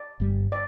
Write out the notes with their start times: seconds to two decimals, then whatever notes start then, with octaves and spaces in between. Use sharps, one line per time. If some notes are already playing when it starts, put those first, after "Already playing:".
Already playing: D5
0.20 G1 G2 G3
0.52 D5